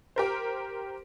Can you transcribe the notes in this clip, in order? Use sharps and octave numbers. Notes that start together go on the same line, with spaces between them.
G4 A#4 C5